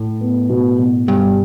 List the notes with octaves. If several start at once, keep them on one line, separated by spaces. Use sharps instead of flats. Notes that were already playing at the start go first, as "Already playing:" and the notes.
Already playing: A2
B3
B2
B2
G2 G3